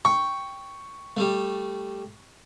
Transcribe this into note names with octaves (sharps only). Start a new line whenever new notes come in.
G5 C#6
G3 A3